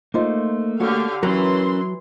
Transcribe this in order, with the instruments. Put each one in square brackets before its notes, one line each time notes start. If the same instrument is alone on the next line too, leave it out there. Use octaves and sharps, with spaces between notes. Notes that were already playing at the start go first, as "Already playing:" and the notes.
[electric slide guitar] A3 A#3 [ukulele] D#4 F4 C5
[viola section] D3 G4 F5 [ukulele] F#4 A4 C#5
[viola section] E3 C6 [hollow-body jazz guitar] F#3 [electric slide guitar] C#4 A#4